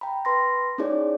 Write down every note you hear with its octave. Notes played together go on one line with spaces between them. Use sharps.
G5 A#5 B5
B4 C6 A#6
C#4 D#4 E4 G#4 C#5 D5